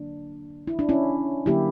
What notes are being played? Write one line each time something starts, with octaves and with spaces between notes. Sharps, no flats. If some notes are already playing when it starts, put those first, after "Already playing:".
Already playing: D3 F#3 A#3 D4
E4
D4
C#4 E4
D3 F#3 A#3 E4 G4